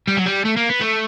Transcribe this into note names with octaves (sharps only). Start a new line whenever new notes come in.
G3
F#3
G3
A3
A#3
B3
A3